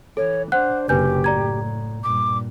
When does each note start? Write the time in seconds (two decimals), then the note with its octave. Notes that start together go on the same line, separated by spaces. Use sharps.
0.17 E3 A4 C#5
0.52 D4 C5 F#5 F#6
0.89 F#1 C3 G4 B4 G#5 G6
1.24 A2 D5 A#5 G#6
2.04 G2 A#2 D6